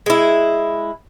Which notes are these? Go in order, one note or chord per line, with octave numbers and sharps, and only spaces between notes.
G#3 E4